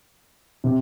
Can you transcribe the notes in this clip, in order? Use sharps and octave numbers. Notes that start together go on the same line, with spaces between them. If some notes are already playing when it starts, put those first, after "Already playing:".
C3